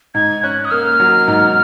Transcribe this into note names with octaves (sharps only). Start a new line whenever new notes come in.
G#2 G#6
C#4 F#6
D#6
A#3 F6
F#3
G#2